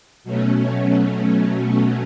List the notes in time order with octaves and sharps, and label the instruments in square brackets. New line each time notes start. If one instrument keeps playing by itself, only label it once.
[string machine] B2 F#3 A3 C#4